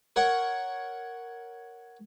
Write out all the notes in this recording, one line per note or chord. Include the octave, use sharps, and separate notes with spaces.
A#4 C#5 F#5